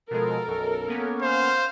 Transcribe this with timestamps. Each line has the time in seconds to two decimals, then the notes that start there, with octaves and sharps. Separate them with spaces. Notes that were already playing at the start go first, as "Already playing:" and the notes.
0.11 B2 F3 G#3 A4 A#4
0.48 B1 F#2
0.88 A#3 B3 C#4
1.22 C5 F5